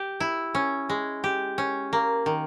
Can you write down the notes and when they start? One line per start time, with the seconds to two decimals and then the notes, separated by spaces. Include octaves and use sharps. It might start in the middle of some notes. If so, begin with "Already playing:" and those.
Already playing: G4
0.20 E4
0.55 C#4
0.89 G#3
1.24 G4
1.58 C#4
1.93 A#3
2.26 D#3